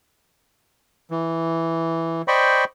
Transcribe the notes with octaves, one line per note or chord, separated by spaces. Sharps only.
E3
C5 D5 D#5 G5 B5 C#6